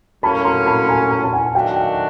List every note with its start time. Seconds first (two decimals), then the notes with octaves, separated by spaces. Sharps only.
0.23 A2 F#3 A#3 C#4 A5 B5
0.45 A#5 C6
0.66 A5 B5
0.88 G#5 A#5
1.11 G#5 A#5
1.23 A5
1.33 F#5 G#5
1.54 D#3 F#3 A3 D4 F#4 F5 G5
1.76 F5 G5